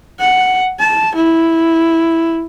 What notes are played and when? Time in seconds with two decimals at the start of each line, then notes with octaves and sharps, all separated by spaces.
0.19 F#5
0.80 A5
1.15 E4